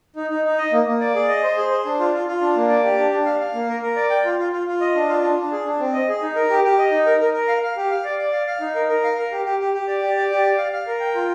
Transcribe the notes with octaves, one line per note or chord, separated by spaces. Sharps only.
D#4
D#4
D#4
D#5
A#3
A#3
D5
G#4
D#5
C5
G#4
C5
D4
F4
F4
F4
D4
A#3
D5
G4
D4
D4
F5
F5
A#3
A#4
A#4
D5
G5
F4
F4
F4
F4
D#5
D4
F4
D4
D4
G#4
D4
C4
D#5
G#4
D#4
A#4
G4
G4
D#5
D#4
A#4
A#4
A#4
F5
F5
G4
F5
D5
D5
F5
F5
D#4
A#4
A#4
F5
A#4
G4
G4
G4
G4
D5
G4
D5
G4
D5
F5
F5
A#4
G5
F4